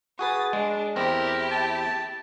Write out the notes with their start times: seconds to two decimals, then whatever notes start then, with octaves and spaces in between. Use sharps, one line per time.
0.19 F#4 G#4 B4 D#6 A6
0.53 G#3 D4
0.96 E2 C4 E4 G4 A#4
1.51 A5